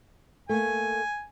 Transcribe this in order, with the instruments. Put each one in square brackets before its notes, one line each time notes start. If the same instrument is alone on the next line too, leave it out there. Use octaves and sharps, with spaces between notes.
[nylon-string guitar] A3 A#3 [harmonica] G#5